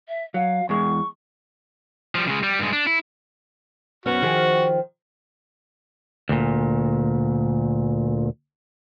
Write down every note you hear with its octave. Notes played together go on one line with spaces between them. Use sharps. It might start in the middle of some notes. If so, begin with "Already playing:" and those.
E5
F#3 F5
E2 G#3 C#6
F3 G3
C#3 G#3
G3
G2 G#3
D4
E4
F#2 B3 C#4 F#4
D#3 F3 G#4
D2 A#2